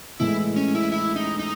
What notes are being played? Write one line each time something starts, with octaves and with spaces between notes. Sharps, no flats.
A2 E3 G#3 E4
C#4
E4
E4
D#4
D#4